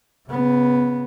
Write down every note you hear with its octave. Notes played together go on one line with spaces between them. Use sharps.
C#3 B3